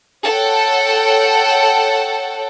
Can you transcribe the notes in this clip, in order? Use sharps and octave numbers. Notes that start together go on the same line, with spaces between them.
A4 C#5 F#5 G5